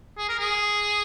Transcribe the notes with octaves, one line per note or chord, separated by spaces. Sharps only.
G#4
A#4
G#4